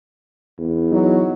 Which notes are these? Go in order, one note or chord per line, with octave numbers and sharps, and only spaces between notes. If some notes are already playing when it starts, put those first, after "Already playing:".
E2
F#3 D#4